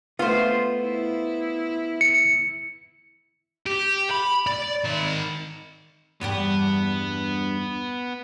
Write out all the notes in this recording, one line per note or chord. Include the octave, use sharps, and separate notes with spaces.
A3 B3 F4 C5
E4
C#7
G4
B5
D5
D#3 B5
E2 G2 B3 G4